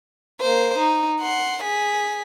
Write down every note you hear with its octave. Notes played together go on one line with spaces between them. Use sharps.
A#3 C5
D#4
F#5 C6
G#4 B6